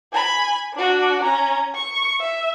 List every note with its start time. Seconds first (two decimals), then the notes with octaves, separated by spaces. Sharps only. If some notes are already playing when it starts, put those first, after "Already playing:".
0.13 G#5 B5
0.74 D4 F#4
1.23 C#4 A#5
1.75 C#6
2.20 E5